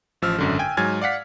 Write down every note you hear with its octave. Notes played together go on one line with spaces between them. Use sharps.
A1 F3 E6 F6
G#1 F#2 D3
G5 G#5 G#6
G#2 F#3 G#5 F6 G#6 A6
D5 F5 F#5 B6